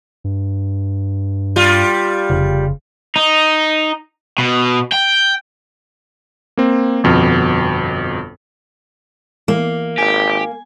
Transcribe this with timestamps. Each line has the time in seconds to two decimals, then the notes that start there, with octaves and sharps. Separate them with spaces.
0.24 G2
1.56 G3 F4
2.30 F1 C#3
3.16 D#4
4.38 B2
4.92 G5
6.57 A#3 C4
7.03 G1 F2 B2
9.48 E3 A#3
9.98 G#1 G4 G#5